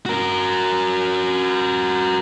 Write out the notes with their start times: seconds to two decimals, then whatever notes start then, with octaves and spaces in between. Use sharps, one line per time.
0.06 F#4 A#4